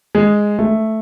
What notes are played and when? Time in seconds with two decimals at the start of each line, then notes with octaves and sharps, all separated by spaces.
0.15 G#3
0.59 A3